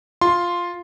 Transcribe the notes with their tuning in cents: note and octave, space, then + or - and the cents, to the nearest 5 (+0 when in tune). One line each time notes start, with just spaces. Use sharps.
F4 +0 C6 +5